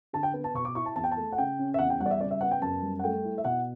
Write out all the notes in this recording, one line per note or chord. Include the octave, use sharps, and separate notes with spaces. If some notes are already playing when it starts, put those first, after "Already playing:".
D3 A5
G5
B3
A5
B2 C#6
D6
E4 C#6
A5
E2 A5
G5
A5
A3
F#5
C#3 G5
C#4
E5
E2 F#5
G5
G3 F#5
D5
E5
C#3 D5
E5
B3 F#5
G5
F#2 A5
G3
F#5
A3 G5
E4
E5
B2 F#5